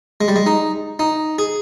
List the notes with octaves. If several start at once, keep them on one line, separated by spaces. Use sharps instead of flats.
G#3
G3
G#3
D#4
D#4
G#4